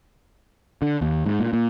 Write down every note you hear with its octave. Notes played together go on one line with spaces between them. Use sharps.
D3
D#2
G#2
A#2
A#2